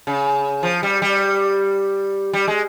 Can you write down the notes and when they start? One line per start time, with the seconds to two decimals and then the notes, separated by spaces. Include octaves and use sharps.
0.07 C#3
0.63 F3
0.83 G3
1.02 G3
2.33 G3
2.48 G#3